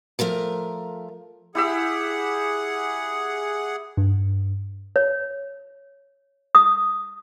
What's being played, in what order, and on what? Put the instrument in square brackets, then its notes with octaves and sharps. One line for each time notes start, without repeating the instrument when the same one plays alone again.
[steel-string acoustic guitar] F3 A3 A#4 A#5
[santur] E4 G4 E5 [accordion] G#4 F#5
[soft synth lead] G2
[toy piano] C#5
D#6